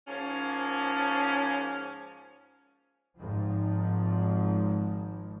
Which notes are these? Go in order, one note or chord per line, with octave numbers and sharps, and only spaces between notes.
G#2 F3 A#3 C#4
G#1 G#2 F3